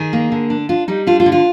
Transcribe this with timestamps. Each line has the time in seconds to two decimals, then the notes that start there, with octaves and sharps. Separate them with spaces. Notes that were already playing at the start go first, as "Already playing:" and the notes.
Already playing: D#3 G#4
0.13 A#3
0.32 D3
0.50 D4
0.69 D4 F4
0.88 G3 D#4
1.07 D4 F4
1.20 F4
1.26 D3
1.32 F4